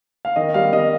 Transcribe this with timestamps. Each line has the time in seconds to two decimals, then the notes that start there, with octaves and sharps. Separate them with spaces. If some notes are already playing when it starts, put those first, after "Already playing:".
0.25 F5
0.36 D#3 D#5
0.54 G3 F5
0.72 D#3 D#5